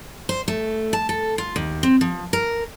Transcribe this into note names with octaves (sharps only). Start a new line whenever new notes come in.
C5
A3
A5
A4
F4
D#2
C4
F3
A#4